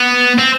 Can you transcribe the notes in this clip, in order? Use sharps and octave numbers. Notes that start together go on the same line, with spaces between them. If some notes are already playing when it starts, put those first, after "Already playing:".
Already playing: B3
C4